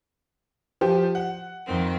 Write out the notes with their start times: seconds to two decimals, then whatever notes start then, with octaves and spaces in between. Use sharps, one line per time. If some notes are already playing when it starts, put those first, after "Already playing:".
0.81 F3 G4
1.15 F#5
1.66 F2 D#3 C4